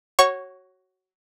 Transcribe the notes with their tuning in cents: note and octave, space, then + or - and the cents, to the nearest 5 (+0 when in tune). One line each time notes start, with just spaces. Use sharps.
F#4 +15 C#5 -15 C#6 +5